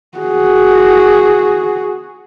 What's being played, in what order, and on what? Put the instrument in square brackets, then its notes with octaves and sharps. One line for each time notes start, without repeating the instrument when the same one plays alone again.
[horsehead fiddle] F#4 G#4